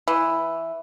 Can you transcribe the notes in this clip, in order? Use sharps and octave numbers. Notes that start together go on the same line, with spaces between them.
E3